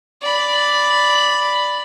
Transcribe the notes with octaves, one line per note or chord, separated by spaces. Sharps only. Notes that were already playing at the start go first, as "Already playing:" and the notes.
D5 B5